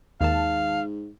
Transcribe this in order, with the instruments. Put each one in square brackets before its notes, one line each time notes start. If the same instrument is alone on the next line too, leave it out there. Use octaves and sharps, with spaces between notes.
[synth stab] D#2 D#3 A5 [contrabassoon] G#2 [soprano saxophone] F5